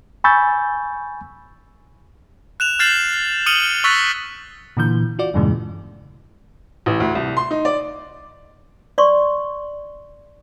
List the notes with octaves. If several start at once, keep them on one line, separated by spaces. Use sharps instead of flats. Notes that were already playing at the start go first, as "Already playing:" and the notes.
G#5 B5 C#6 E6 G6 A6
F#6 E7 F7
F6 G6 A6 C7 E7 F#7
D#6 F6 C#7 D#7 F#7 G7
C#6 E6 F#6 A6 B6
A#2 D3 E3 G6
F4 F#4 D5
E2 G2 A#2 C#3 E3 G#3
A1
D2
C2
C6
D#4
D5
D5 C6 C#6